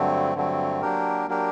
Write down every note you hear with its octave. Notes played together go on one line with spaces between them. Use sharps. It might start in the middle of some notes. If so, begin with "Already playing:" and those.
Already playing: G2 D3 F#3 A3 C4
G2 D3 F#3 A3 C4
F#3 A#3 D4 G4 A#4
F#3 A#3 D4 G4 A#4